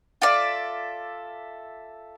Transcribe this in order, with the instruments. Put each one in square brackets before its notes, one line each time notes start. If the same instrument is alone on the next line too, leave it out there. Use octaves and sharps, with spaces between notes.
[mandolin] F4 A4 D5 E5